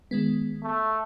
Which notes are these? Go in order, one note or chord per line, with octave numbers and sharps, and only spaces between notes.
D#3 G#3 B3
A3